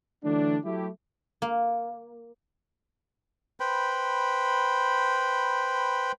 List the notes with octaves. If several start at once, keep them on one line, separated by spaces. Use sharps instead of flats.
D3 E3 F#3 A3 D4
F#3 A3 E4 G4
A#3
B4 C5 G5 B5